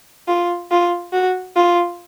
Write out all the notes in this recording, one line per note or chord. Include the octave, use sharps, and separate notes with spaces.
F4
F4
F#4
F4